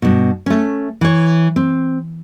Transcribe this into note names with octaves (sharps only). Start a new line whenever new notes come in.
G2 B2
A3 C#4
E3 C#5
C4